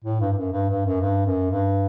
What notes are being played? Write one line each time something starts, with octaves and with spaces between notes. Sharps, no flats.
A2
G2
G2
F#2
G2
G2
F#2
G2
F#2
G2